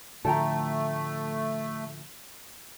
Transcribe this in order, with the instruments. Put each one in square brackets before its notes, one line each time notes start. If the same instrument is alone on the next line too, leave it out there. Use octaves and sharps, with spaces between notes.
[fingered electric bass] A2 D3 F3 [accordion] A3 [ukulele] A4 G5 A#5